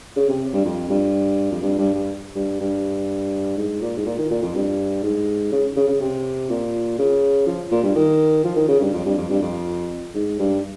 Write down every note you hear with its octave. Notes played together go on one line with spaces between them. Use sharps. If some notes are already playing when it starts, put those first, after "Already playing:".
C#3
C3
G2
F2
G2
F2
G2
G2
G2
G2
G2
G#2
A#2
G#2
A#2
D#3
A#2
F2
G2
G#2
C#3
C#3
C#3
C3
A#2
C#3
F3
A#2
G2
D#3
F3
D#3
C#3
G2
F2
G2
F2
G2
F2
G#2
G2